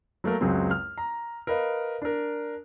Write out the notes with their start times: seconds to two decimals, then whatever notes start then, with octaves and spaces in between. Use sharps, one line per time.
0.24 F#3 A3 A#3 A#4
0.41 C#2 F#2 F#3 G#3 C4
0.71 F6
0.98 A#5
1.47 A#4 B4 D#5 F5
2.02 D4 A#4